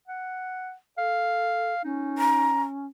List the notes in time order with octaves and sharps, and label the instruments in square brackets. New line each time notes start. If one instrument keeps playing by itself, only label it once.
[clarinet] F#5
[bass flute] A4 [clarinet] F5
[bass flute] C#4 [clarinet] D#4
[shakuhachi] A#5